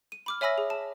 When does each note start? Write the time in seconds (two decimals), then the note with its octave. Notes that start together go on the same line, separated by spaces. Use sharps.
0.12 D#7
0.26 B5 D6 F6
0.41 C#5 E5 G#5 B5 E6 A#6
0.58 G#4
0.70 A5